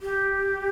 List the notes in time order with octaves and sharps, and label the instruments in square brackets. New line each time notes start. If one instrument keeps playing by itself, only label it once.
[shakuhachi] G4